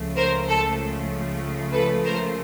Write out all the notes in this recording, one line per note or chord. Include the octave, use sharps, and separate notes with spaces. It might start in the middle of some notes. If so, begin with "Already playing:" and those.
Already playing: C#2 C#3 F3 A3
A#4 C5
A4
A4 B4
A#4 C5